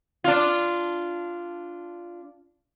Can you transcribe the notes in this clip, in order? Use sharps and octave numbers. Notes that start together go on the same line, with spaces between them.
D4 F4